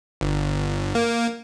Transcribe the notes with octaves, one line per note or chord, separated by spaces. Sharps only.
G1
A#3